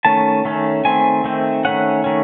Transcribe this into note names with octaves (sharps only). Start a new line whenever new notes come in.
D#3 A3 C#4 A5
D#3 A3 C#4
D#3 A3 C4 G#5
D#3 A3 C4
D#3 A3 C#4 F#5
D#3 A3 C#4